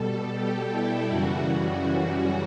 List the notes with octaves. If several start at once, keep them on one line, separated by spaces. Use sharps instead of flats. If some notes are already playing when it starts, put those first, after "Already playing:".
Already playing: B2 G3 A4
G4
E4
F#2 C#3 E3 G3 F#4